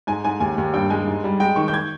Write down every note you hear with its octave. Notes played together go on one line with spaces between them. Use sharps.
G#2 G#5
G#2 G#5
D#2 G#5
D#2
G2 G5
G#3 G#5
G#2
G3
G#3 G5
D#3 C#6
G6
G#6